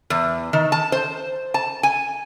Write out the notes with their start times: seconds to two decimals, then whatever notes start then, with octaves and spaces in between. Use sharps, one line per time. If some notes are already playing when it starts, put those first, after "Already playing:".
0.10 E2
0.53 D#3
0.72 A5
0.92 C5
1.54 A5
1.83 G#5